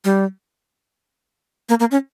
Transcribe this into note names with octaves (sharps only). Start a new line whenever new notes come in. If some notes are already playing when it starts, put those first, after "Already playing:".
G3
A#3
A#3
C#4